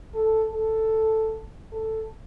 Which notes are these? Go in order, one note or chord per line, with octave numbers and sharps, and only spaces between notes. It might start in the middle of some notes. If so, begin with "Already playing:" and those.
A4
A4
A4